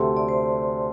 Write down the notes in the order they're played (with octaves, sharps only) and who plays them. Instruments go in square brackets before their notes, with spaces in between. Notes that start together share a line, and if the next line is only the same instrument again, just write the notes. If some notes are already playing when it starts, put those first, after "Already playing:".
Already playing: [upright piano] D2 C3 A3 C4 [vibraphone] A5 C6
[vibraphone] D5
C5